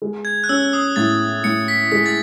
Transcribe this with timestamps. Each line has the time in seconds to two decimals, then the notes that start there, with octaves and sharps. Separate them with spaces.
0.02 G#3
0.25 G#6
0.44 F#6
0.49 C#4 E6
0.73 D#6
0.96 A2 A6
1.44 A2 C#7
1.68 B6
1.92 G#3 B6
2.06 A6